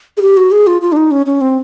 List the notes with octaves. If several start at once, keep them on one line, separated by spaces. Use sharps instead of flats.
G#4
G4
F#4
G#4
F4
F4
D4
D#4
C#4
C#4
C4